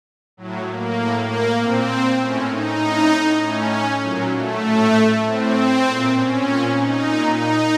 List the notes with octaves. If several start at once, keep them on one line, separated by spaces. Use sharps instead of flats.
A2 F#3
A#3
A2
A#3
A#2 C4
A2 C#4
D#4
A2
A2 C#4
A#2 F#3
A3
A2
A2 C4
A#2
C#4
A#2
D#4
A#2
D#4